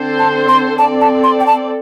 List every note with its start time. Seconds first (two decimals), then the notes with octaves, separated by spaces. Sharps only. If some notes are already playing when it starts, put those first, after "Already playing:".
Already playing: D3 C4 A4 C5
0.19 A5
0.48 C6
0.78 C4 A4 D5 A5
1.01 A5
1.24 C6
1.40 G5
1.46 A5